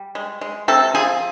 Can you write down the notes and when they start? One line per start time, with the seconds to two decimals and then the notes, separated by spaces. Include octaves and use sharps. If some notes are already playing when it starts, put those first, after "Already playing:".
Already playing: G3
0.15 G#3
0.41 G#3
0.68 C3 A4
0.95 F3 G#4